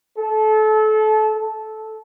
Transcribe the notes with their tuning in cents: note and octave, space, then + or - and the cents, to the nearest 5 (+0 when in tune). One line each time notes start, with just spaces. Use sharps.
A4 -25
A4 -15